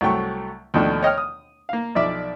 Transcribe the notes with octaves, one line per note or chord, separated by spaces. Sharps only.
C2 F#3 A3 G5 C#6
D#2 B2 F3 A3 D4
C#5 D#5 G5 F6
D#6
A#3 F5
B1 F3 D5 E5 D6